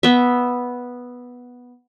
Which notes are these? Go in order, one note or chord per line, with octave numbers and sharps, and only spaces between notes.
B3 E5